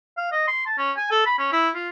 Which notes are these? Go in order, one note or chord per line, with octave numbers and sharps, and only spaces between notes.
F5
D#5
C6
A5
C#4
G#5
A4
B5
C#4
E4
F4